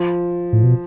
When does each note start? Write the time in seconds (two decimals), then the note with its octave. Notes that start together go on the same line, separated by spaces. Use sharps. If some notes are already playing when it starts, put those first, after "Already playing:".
Already playing: F3
0.53 A2
0.64 B2